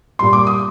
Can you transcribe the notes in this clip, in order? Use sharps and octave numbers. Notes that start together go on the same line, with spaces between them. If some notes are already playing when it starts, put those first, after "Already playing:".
A#2 G3 C6
D6
D#6